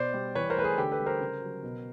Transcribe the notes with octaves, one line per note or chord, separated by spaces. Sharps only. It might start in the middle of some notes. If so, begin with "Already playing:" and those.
Already playing: B2 C5 D5
G3
E3 B4 C#5
A#4 C5
A3 B4
G#4 A#4
D3 G4 A4
A4 B4
G3
A#4 C5
C#3
F#3
B2